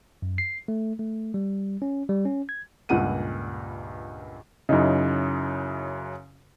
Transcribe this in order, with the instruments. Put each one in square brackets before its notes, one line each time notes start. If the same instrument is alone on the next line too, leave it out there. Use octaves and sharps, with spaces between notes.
[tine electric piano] F#2
C7
A3
A3
G3
C#4
G3
C#4
G#6
[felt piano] C#2 G2 A#2 F#5 D#7
[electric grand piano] F#2 C#3 [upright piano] D#4 E4